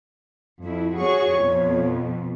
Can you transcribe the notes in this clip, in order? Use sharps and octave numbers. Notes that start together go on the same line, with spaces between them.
F2 E4
F#4 G#4 C#5 C#6
F2 B2